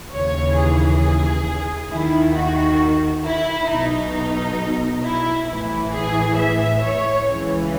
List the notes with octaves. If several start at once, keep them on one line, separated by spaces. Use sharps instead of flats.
D#2 C#3 E3 C#5
G#4
D#2 D#3 E4
F#4
E4
B1 B2 D#4
E4
A1 A2 E3 E4
G#4
E5
C#5
C#2 C#3 E3